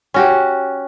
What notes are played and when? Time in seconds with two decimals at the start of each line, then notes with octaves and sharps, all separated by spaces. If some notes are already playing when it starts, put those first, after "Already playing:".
0.14 C#4 F#4 G4